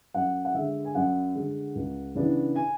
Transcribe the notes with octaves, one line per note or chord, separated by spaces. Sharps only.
F#2 F#5
F#5
D3 G#3 E5
G#5
F#2 F#5
D3 G#3
C#2
C#3 E3 B3 D4
G#5